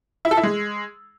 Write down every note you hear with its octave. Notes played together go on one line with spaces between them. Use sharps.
E4
A4
E4
G#3